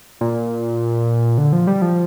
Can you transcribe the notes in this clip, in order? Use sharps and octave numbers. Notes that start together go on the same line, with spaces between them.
A#2
D3
F3
G3
F3